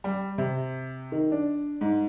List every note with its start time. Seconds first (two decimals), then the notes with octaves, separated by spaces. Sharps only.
0.04 G3
0.38 C3
1.12 D#3
1.32 D4
1.81 G#2